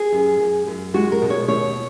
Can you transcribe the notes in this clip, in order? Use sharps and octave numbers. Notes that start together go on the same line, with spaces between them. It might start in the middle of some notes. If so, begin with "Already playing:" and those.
Already playing: G#4
F#2
F#2
F#2
G#3 F#4
A#4
B2
C#5
D#2 C#5